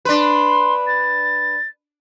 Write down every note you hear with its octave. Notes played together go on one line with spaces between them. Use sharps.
D4 B4 C6
A6